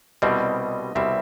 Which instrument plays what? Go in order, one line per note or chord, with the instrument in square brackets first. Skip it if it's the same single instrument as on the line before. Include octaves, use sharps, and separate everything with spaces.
[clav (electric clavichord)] C2 B2 G3 C4 [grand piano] D#5
[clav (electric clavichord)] C2 B2 G3 C4 [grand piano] E5